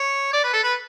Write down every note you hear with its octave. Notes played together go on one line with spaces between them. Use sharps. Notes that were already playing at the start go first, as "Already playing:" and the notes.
Already playing: C#5
D5
B4
A4
B4